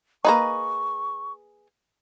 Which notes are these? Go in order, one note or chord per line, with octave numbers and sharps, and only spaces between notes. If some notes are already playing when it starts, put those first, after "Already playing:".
A#3 D#4 G#4 B4 A#5 C#6